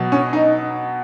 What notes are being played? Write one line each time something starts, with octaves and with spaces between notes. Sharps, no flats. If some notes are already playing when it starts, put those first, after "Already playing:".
Already playing: B2 F#3
C#4
D#4